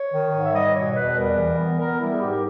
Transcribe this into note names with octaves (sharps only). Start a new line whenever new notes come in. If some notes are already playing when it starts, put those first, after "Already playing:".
Already playing: C#5
D#3
G#2
E5
G3 D#5
B2 C#5
E2 B4
G3 A#4
E3
B3
B3 A#4
G3 E4
G#4
G#2 G4
A#4